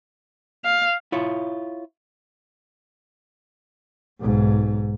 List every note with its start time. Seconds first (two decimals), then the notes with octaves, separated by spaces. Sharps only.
0.64 F5
1.12 E4 F4 C#5
4.20 B1 G#2